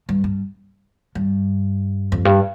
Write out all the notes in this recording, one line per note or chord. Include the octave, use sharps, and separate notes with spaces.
G2
G2
G2
F2
G2